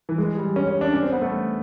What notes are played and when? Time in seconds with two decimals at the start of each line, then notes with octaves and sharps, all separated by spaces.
0.09 E3
0.18 G#3
0.37 G3
0.56 C#4
0.68 C#4
0.81 D4
0.93 C#4
1.02 C4
1.12 B3
1.22 A3